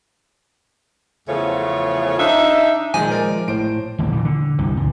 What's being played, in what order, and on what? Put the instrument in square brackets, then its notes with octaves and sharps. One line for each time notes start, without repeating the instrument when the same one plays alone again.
[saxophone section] E2 C#3 F3 A3 F4 C#5
D4 D#4 E5
[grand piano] A#2 D#3 [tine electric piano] F3 G#3 [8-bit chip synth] G#5
[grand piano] A#4 D5
[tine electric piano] A2 [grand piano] C5 D7
[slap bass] D#1 A1 E2 D3
A#2 D3 E3
D3
C2 G2 C3 E3
C#2 A#2